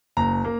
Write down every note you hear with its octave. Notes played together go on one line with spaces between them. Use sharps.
F#1 A#5
A#3